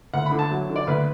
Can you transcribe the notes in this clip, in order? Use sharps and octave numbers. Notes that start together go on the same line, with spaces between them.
D2 F#5
B5
D3
A5
F#3
D3
D5
D2 B4